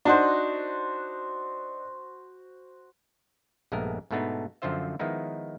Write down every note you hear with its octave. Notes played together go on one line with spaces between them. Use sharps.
D4 D#4 F#4 C5 F#5
A#1 G2 G#3 A3 B3 A#4
G#2 B2 A3 B3 D4 D#4
F#2 D3 F3 F4 C5 E5
D#3 F3 G#3 B3 D#4 E4